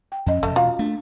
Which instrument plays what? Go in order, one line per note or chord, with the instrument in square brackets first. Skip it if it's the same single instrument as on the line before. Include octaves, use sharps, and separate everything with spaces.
[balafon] G5
[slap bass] F2 [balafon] C#4 D#5
[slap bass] E1 [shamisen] A3
[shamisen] F4 F#4 A#5
[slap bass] A3 [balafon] D4